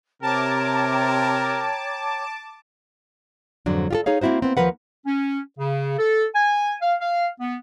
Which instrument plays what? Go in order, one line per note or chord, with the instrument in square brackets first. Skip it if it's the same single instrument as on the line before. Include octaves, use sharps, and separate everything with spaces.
[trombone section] C3 [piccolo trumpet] A#4 [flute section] C#5 G5 A#5 [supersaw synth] A5 D6
[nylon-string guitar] F2 G#2 D3 F#3 D4
F4 G4 A4
D#4 G#4 C#5 F5
A#3 C4 E4 F#4 C5
B3 C4
D#2 E3 F3 A#4 B4 F#5
[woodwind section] C#4
C#3
A4
G#5
F5
F5
B3